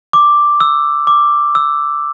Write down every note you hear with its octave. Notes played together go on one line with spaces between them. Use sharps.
D6
E6
D6
E6